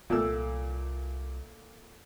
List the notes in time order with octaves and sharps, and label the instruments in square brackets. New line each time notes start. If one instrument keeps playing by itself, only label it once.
[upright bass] C2 [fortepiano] A#2 A3 E6